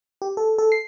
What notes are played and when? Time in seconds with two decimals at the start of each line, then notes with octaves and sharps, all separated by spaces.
0.22 G4
0.37 A4
0.58 A4
0.72 C7